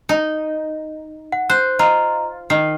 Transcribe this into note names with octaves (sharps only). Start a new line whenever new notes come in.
D#4
F#5
C5 F#6
F4 D#5 A#5
D#3 C7